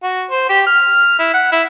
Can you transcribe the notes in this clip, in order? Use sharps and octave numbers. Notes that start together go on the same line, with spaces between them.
F#4
C5
G4
F6
E4
F#5
E4